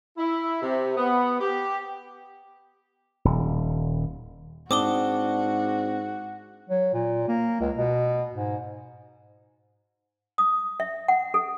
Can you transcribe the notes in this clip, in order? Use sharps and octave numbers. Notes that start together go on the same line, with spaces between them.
E4
C3
B3
G4
D#1
G#2 C4 D4 F#4 D6 D#6 G7
F#3
A#2
A#3
C#2
B2
G#2
D#6
E5
F#5
A4